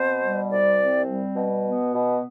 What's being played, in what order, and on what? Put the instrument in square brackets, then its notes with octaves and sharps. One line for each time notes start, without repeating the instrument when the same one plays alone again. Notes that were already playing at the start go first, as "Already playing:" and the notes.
Already playing: [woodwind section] B2 C4 C5
G3
C2 D5
C4
G3
B2
B3
B2